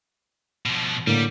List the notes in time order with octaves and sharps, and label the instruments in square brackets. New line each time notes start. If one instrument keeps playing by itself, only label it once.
[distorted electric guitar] B2 F3
[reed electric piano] A2 D3 A#3 [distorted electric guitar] G3